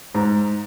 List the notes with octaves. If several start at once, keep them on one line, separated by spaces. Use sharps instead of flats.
G#2